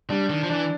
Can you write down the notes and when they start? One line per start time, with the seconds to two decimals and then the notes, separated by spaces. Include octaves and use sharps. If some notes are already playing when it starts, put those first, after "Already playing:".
0.10 G3 D4
0.30 D#3
0.43 F3
0.50 E3 D4